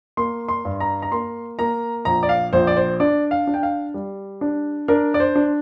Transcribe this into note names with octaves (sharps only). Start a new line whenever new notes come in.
A#3 C6
C6
G2
A#5
A#5
A#3 C6
A#3 A#5
A#1 A#5
D5
F5
A#1 C5
D5
C5
D4 D5
F5
D4
G5
F5
G3
D4
D4 A#4
D5
C5
D4